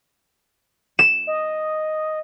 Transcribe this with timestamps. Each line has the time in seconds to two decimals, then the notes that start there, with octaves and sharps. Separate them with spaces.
0.99 E7
1.27 D#5